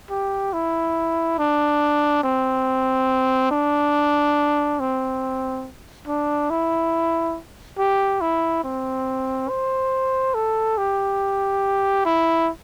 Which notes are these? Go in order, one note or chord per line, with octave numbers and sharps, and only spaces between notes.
G4
E4
D4
C4
D4
C4
D4
E4
G4
E4
C4
C5
A4
G4
E4